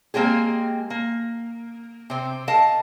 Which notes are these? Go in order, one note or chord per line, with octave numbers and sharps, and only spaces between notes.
G#3 A#3 C4 G4 G#4
A#3
C3 C4
A#4 D#5 F5 A5